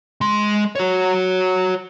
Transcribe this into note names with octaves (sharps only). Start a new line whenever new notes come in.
G#3 C6
F#4 C#5